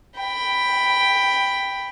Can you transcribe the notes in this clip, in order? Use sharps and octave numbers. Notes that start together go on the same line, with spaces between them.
G5 B5